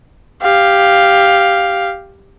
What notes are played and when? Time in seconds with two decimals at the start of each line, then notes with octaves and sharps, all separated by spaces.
0.42 G4 F5